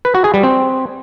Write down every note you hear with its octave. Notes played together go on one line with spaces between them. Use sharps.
B4
F#4
G#4
G3
C4